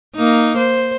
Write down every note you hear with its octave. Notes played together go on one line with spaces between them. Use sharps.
A#3 D#4
C5